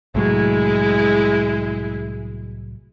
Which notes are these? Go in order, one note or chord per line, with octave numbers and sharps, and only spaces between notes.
C2 A2 F#3 G#3 E4